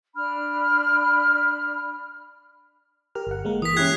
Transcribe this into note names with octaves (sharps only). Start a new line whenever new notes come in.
D4 B5 F6
G4 A#4 F6
G1 F#5
G#3 A#3 A#4
E3 D#6 B6
C#4 E4 G4 F#6 G#6 C7